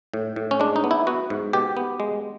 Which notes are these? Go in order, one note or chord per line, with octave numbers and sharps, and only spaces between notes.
A2
A2
C#4
G#3 D4
D#4
B3
E4
B3 F#4
G#2
B2 G4
B3
G#3